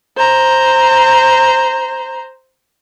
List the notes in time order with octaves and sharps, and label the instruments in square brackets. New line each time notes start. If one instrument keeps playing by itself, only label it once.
[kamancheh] C5 A#5